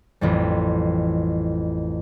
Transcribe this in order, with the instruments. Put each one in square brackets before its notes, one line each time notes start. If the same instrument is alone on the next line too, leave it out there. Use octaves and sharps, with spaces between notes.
[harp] A1 F2 G3